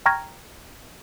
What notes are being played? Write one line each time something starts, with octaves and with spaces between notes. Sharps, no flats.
G5 A#5 C#6 F6 G#6 A#6